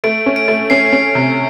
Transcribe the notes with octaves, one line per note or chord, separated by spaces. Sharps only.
A3 D7
C#4
D7
A3
C#4 C7
C#4
C3